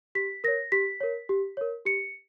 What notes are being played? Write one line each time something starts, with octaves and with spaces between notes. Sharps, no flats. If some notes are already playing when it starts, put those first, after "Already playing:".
G4 B6
A#4 C#5 A#6
G4 B6
A#4 C#5
G4
A#4 C#5
G4 C#7